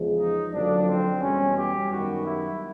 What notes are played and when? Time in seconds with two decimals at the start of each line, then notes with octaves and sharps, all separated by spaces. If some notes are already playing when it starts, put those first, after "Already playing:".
Already playing: E2 C#3 F3 G#3
0.16 D#4
0.51 F#1 F2 D3 F#3 D4
0.86 C4
1.20 E2 B2 G3 C#4
1.55 G4
1.89 F#2 D#3 G3 B3 F#4
2.25 E4